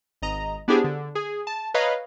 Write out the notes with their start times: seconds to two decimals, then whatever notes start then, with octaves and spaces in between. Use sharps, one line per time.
0.22 G#1 D#5 A#5
0.68 B3 D4 E4 G4 G#4 C5
0.84 D3
1.15 G#4
1.47 A5
1.74 B4 C#5 D#5 F5 A#5 B5